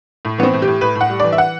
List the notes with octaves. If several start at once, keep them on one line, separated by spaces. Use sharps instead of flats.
A2
E3 B3 C4
A2
G4
A2
A2 B4
A2
F#5
G3
E3 D5
E5
F#5